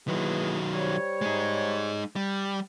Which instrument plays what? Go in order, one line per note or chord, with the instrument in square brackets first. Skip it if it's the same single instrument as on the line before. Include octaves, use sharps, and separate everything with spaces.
[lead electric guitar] D#3 F#3 [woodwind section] E3 A#3 G#4
[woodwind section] G3 C5 C#5
[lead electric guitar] G#3 D#4
G3